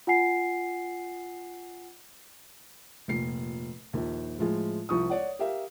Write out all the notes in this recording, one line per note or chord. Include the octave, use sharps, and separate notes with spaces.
F4 F#5 G#5 C7
F1 A#2 C7
A#1 D#2
A2 F3 G#3
C2 F3 C#6 D#6
C#5 D5 F#5
G4 A#4 E5 F5